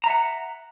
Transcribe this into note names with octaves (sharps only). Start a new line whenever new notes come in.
E5 F#5 A#5